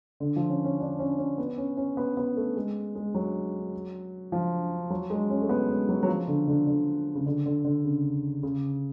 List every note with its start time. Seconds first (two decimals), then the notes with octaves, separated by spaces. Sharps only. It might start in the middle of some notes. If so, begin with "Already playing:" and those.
0.20 D3
0.36 F3
0.50 C#4
0.65 C#4
0.80 D4
0.99 C#4
1.18 C#4
1.38 B3
1.58 C#4
1.77 C#4
1.97 B3
2.17 B3
2.37 A3
2.56 G#3
2.95 G#3
3.15 F#3
4.32 F3
4.90 F#3
5.10 G#3
5.30 C#4
5.42 A3
5.49 B3
5.69 G#3
5.89 F#3
6.03 F#3
6.08 F3
6.28 D3
6.48 D3
6.67 D3
7.15 C#3
7.26 D3
7.46 D3
7.65 D3
7.85 C#3
8.43 C#3